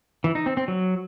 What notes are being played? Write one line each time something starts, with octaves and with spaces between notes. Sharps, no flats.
E3
D#4
C4
C4
F#3